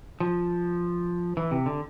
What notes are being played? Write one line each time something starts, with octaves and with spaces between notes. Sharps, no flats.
F3
E3
C3
D3